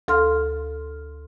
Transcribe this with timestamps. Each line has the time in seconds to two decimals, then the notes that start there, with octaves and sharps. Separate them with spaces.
0.08 D2 A4 F5 C6 F6